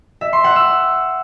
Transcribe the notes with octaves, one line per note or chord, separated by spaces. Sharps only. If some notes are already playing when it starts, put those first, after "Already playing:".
E5
C6
F#5
E6